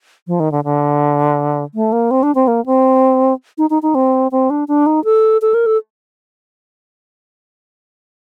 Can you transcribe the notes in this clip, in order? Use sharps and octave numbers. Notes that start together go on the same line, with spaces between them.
F3
D#3
D3
D3
A3
A#3
C4
D4
C4
A#3
C4
D#4
D#4
D#4
C4
C4
D4
D4
D#4
A4
A4
A#4
A4